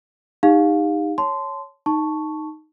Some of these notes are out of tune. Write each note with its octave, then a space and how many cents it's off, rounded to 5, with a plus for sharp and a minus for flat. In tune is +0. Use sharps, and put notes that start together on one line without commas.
D#4 +0 G4 +35 F5 +20
C#5 +0 A5 -5 C6 -15
D#4 +0 A5 +0 C#6 +0